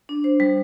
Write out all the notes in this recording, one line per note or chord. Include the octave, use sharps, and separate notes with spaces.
D4
C5
G3